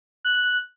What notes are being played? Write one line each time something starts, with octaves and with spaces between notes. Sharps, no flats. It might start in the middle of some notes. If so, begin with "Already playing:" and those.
F#6